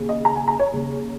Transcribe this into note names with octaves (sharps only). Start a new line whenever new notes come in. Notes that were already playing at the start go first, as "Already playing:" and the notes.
Already playing: D#2 C#3
D#5
A#5
G#5
A#5
C#5
D#2 C#3